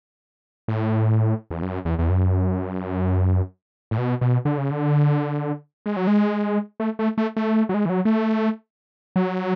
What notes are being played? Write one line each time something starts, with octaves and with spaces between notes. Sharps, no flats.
A2
E2
F#2
E2
E2
F#2
A2
B2
B2
D3
C#3
D3
G#3
F#3
G#3
A3
A3
A3
A3
F#3
G#3
E3
F#3
A3
F#3